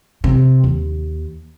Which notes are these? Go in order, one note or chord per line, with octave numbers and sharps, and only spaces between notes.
C3
D#2